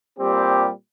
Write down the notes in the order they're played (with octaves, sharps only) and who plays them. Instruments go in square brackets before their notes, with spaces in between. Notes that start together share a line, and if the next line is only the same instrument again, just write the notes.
[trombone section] A#2 G3 C4 G4